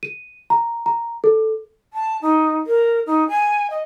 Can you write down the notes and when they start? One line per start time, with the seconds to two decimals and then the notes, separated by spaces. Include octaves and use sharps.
0.03 D#7
0.50 A#5
0.86 A#5
1.24 A4
1.93 A5
2.22 D#4
2.67 A#4
3.07 D#4
3.29 G#5
3.70 D#5